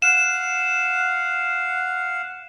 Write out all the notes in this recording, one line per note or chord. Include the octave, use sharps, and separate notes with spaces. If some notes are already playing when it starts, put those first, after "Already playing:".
F5 F#5 E7